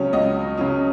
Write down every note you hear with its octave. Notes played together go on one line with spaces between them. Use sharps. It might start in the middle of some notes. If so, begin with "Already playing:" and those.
Already playing: C#2 C#3 F#3 C#4 C#5
C#2 D#5
C#3 F#3 C#4